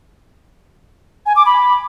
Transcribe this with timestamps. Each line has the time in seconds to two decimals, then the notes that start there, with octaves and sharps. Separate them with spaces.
1.26 G#5
1.36 D6
1.46 B5